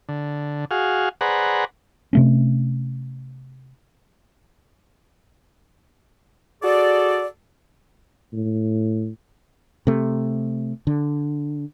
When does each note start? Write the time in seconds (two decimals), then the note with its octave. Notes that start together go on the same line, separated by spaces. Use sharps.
0.09 D3
0.71 F#4 G#4 F5
1.21 G#4 B4 C5 D5 F#5 A#5
2.13 C3 A3 C#4
6.63 F#4 G#4 A4 D5
8.32 A2
9.87 C3 A3
10.87 D3